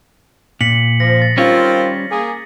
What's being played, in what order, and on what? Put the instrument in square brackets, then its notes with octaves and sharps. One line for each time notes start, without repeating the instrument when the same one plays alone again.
[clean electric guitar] A#2 [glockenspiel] B6 C#7 F#7
[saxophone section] F3 [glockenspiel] A#6
[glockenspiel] A6
[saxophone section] D#3 C4 F4 [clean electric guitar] G3 C#4 C#5
[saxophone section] A#3 G#4